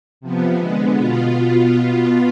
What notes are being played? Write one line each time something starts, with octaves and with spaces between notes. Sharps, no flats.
C3 F3 B3
D3 G#3 B3
B2 B3 F4